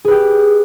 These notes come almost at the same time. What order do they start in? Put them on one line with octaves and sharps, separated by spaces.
G#4 B4 G4